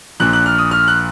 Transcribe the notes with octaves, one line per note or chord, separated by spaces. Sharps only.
A#1 A#2 F#6
F#6
F6
D#6
F6
F#6